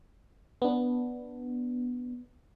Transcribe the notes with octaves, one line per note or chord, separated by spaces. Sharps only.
B3 D4